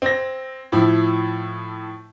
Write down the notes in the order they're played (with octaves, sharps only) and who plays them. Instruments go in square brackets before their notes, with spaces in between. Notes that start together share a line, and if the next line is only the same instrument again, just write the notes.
[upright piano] C4 A#6
A2 F3 E4